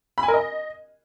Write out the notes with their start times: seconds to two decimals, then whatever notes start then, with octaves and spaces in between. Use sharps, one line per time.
0.18 B5
0.23 G#5
0.28 A#4
0.34 D#5